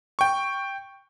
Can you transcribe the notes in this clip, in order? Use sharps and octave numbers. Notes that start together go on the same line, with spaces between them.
G5 C#6